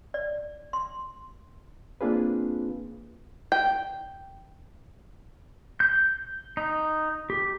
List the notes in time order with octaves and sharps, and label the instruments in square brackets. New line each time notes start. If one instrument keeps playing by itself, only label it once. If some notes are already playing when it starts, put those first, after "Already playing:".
[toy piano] D5
C6
[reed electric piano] A#3 C4 D4 F4 G#4 B4
[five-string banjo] G5
[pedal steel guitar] G6
D#4
G4